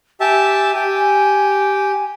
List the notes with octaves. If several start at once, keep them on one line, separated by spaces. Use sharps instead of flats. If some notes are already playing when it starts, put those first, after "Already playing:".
G4 E5 G#5 A5
G4